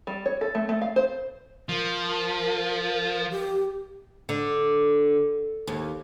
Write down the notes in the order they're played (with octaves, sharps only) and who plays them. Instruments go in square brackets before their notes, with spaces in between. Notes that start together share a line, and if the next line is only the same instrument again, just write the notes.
[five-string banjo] G3
C#5
A4
A3
A3
F5
C5
[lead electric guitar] F3 [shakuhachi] A#4
[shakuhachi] G4
[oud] D3
D#2